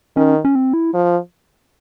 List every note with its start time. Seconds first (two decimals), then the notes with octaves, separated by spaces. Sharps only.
0.16 D#3 C#4
0.45 C#4
0.55 C4
0.73 E4
0.94 F3